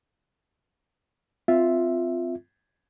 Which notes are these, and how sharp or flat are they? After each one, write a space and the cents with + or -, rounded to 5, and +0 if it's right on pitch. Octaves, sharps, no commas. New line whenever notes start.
C4 -15 F4 +0 E5 +0